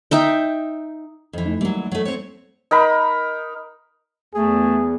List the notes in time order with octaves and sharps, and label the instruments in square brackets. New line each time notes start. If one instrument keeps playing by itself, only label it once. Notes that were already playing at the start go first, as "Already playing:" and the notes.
[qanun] D#4 E5 G5
[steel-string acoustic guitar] F2 E3
[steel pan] A3 D#4
[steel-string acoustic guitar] E3 F#3 [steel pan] G3 A#3
[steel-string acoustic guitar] F#3 A3
C4 C#5
[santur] D#4 A#4 B5
[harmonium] E2 [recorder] A3 [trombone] G#4